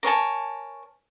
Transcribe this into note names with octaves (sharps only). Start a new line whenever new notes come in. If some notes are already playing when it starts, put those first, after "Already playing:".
A#4 C#5 G#5 A5